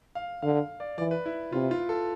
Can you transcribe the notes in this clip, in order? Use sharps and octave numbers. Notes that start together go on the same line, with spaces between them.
F5
D3 F5
D5
E3 D5
B4
E4
C3 F4
F4
A4